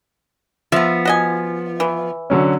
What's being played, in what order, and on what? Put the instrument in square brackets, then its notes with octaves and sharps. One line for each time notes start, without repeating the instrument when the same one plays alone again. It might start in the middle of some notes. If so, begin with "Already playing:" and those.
[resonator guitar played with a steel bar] F3 B3 [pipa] E5
[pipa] F#4 D#5 G#5
E3
[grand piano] D3 F#3 C#4